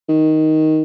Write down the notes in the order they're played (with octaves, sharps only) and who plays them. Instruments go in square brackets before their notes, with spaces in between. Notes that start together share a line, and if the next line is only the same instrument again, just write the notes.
[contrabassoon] D#3